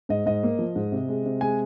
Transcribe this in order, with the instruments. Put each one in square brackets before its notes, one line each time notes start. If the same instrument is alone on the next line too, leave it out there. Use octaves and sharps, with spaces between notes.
[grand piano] G#2 D#5
G#2 D#5
A#3
F3
G#2
C3
G#3
C3
G#3 G#5